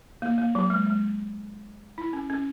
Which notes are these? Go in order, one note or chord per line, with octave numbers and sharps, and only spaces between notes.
A#3
A#3
F#3
G#3
G#3
E4
C#4
C#4